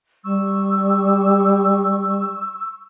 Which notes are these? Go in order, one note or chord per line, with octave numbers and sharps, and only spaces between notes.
G3 C#6 E6